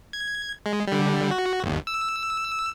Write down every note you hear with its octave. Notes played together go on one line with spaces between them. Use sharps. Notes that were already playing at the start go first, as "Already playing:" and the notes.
G#6
G#3
D3 G3
F#4
G1 D#2
E6